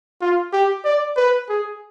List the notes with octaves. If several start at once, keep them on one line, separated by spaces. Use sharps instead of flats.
F4
G4
D5
B4
G#4